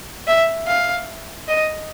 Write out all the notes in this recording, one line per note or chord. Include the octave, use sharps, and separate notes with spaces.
E5
F5
D#5